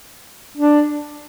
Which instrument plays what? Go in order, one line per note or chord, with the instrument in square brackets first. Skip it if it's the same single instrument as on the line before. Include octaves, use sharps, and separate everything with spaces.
[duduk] D4